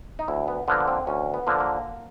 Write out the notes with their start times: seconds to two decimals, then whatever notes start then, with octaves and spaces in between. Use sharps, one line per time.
0.19 D#4
0.28 D2 E4
0.48 B3
0.68 D3 F3 A#3 B3
0.88 C4
1.07 D2 C#4
1.34 B3
1.47 D3 F3 A#3
1.60 A#3